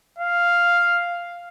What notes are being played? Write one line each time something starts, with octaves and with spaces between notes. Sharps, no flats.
F5